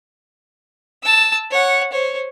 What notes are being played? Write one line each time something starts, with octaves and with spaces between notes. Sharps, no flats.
A5 E6
C#5 F#5
C5 C#5